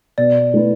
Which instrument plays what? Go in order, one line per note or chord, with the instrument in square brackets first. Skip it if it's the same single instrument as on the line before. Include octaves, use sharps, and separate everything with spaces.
[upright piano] B2 [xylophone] D5
[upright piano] A3 E4 B4